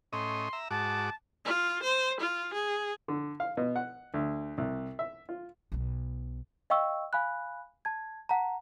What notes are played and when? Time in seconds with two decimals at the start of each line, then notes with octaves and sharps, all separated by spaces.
0.13 A2 C#4 D#5 C6
0.53 E5 A#5
0.71 G#2 F#4 A5 D6
1.45 F4
1.83 C5
2.20 F4
2.53 G#4
3.08 D3
3.40 F5
3.57 B2
3.76 F#5
4.14 D2
4.58 C2
4.99 E5
5.29 F4
5.72 B1 B3
6.70 D#5 F5 G5 C#6 E6
7.13 F5 G#5 B5 F#6
7.85 A5 G#6
8.29 F#5 A5 A#5